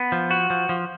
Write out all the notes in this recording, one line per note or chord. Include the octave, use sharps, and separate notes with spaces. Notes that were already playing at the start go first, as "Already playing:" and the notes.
Already playing: B3
F3
F#4
F3
F3